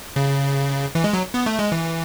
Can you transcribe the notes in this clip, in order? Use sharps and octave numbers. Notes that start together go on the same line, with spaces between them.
C#3
E3
G#3
F#3
B3
A3
G#3
E3